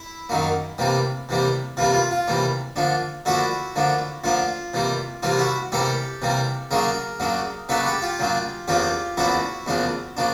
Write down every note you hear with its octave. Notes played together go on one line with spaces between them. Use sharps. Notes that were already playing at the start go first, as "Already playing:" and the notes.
Already playing: E4
F#2 D#3 F#3 A#3
C3 E3 G3 A#3
C3 E3 G3 A#3
C3 E3 G3 A#3 F4
F4
F4
C3 E3 G3 A#3
D3 F3 A#3 D4
D3 F3 A#3 D4 E4 F#4
D3 F3 A#3 D4
D3 F3 A#3 D4 F4
C3 E3 G3 A#3
C3 E3 G3 A#3 F4
E4 F#4
C3 E3 G3 A#3 G4 A4
C3 E3 G3 A#3
C#3 F#3 A#3 D4 G#4 A#4
C#3 F#3 A#3 D4
C#3 F#3 A#3 D4 A4 B4
G4 A4
F4 G4
C#3 F#3 A#3 D4
E2 C#3 F3 A#3 D4 F4 G4
E2 C#3 F3 A#3 D4 E4 F#4
E2 C#3 F3 A#3 D4
C#3 F3 A#3 D4